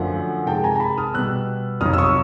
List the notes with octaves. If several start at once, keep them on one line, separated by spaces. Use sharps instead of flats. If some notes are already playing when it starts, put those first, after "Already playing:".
Already playing: F#2 D3 F3 A3 F#5
C3 D#3 G#3 G5 A5
G#5 A#5
A#5
A5 B5
D#6 F6
B2 G3 B3 E6 F#6
F2 C3 D#3 F#3 D#6 F6
E6
C#6 D#6